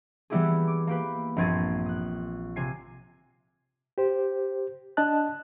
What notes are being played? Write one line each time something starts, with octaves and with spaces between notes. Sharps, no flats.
E3 G3 B3 E4 G4 G#4
D6
A#3 G4 B4
A#1 G2 C4 G#6 A6 D#7
D#6 F#6
C3 G#5 C7
G4 C5
D4 D#5 A5 F#6